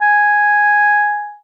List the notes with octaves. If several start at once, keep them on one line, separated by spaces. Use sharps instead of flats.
G#5